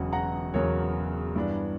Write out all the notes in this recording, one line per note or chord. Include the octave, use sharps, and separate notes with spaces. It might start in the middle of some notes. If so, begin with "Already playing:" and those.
Already playing: E1 E2 C#3 F#3 F#5
F#5 A#5
E1 E2 C#3 F#3 A#4 C#5
G2 E3 B3 D4